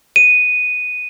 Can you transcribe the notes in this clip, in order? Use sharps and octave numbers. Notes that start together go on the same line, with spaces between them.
D#7